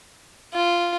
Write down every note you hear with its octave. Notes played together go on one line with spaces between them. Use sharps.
F4